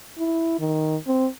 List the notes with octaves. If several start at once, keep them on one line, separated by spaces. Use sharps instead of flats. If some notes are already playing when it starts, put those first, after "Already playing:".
E4
D#3
C4